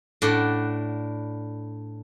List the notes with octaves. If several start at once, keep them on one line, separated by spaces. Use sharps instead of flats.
A2 D4 F#5